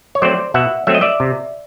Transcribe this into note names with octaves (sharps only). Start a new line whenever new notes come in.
C#5
F#3 A3 C4 C5 D5
B2 E5 F#5
F#3 A3 C4 E5
D#5
D5 E5
C3